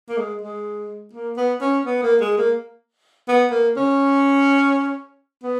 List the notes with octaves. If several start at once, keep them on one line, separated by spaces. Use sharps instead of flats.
A#3
G#3
G#3
A#3
B3
C#4
B3
A#3
G#3
A#3
B3
A#3
C#4
B3